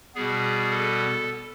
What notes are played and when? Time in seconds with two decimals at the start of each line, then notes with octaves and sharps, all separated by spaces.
0.15 B2 G3 B3 G#4
0.71 A4